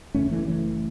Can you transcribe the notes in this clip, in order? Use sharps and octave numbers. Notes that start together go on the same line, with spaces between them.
F#1 E2 C#3 A3 C#4
E3 A3
E3 A3